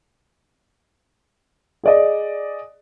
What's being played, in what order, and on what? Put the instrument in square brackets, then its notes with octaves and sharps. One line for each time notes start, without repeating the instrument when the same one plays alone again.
[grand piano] G#4 D5 D#5